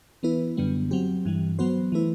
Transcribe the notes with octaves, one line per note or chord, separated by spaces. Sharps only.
E3 B3 E4 B4
F#2 D3 G3 B3
F#3 C4 G4
G2 E3 G3
F#3 B3 F#4 C5
E3 A3 E4 B4